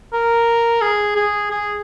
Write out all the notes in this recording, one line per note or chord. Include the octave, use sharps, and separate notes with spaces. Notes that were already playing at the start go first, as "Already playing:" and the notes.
A#4
G#4
G#4
G#4